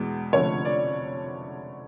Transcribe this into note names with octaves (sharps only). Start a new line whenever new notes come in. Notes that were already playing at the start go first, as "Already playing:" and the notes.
Already playing: E2 B2 G#3
F1 F2 D3 F3 A3 C#5
D5